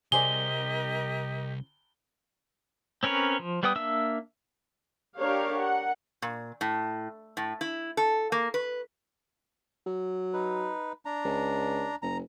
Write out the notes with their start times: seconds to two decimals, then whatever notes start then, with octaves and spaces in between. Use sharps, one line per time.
0.12 C2 G4 G#4 A#4 C5 D5 D#5 G7
3.03 C4 C#4 A#4 B4 C#5
3.39 F3
3.63 G3 B3 B4 G5 D#6
3.76 A#3 D4 E5 E6
5.18 D4 G4 A#4 C#5 F5
5.55 A#4 F#5
6.22 A#2
6.61 A2
7.37 A2
7.61 E4
7.97 A4
8.32 A#3
8.54 B4
9.87 F#3
10.33 D#4 B4
11.05 D4 A#5
11.25 C#2
12.02 F#1 A#5